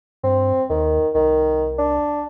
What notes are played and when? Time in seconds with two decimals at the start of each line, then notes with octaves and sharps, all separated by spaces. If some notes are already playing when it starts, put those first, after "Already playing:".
0.23 G2 C4
0.70 D#2 D#3
1.15 C2 D#3
1.78 D4